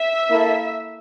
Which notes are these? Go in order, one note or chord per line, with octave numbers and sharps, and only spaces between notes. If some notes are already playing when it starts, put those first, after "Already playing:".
Already playing: E5
A#3 E4 A4